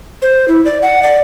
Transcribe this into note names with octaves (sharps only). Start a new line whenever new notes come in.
C5
E4
D5
F#5
D5